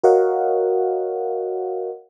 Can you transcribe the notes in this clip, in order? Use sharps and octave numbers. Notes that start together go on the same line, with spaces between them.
F#4 A#4 C#5 D#5 F5 F#5